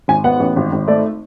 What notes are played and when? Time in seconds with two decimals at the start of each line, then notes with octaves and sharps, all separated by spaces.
0.08 G#1 G#5
0.24 B3 F#5
0.40 A1
0.56 G#1
0.72 G#1
0.88 A3 D5